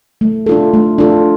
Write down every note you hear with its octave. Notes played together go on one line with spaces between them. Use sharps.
A3
D4 F4 A4
A3
D4 F4 A4